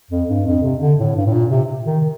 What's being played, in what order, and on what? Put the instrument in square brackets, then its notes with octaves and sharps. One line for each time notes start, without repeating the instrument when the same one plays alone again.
[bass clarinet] F2
G2
F2
C3
D3
A2
G2
A2
A#2
C3
D#3